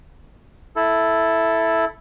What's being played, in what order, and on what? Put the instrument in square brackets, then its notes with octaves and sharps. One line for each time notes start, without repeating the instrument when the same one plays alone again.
[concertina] E4 A4